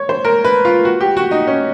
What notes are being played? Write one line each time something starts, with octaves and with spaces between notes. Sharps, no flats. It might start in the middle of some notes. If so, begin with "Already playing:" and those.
Already playing: C#5
C5
A#4
B4
F4
F#4
G4
F#4
D#4
C#4